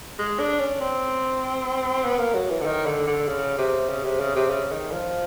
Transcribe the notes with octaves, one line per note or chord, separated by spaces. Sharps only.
G#3
D4
C#4
C4
B3
A#3
F#3
E3
D3
D#3
D3
D3
C#3
C3
C#3
C3
C#3
C3
C#3
D#3
F3